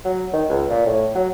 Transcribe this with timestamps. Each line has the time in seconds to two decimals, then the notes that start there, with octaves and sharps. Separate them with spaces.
0.05 F#3
0.33 D#3
0.49 C#2
0.70 A#2
0.86 A2
1.15 F#3